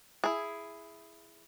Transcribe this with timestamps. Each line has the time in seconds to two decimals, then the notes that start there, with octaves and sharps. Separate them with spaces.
0.24 E4 G#4